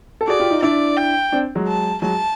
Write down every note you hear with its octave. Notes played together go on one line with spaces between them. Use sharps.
A4
F#4 G#4 D5
F4 G4
D#4 F4
D4 E4 D5
G5
C4 D4
F#3 G#3
A5
F#3 G#3 A5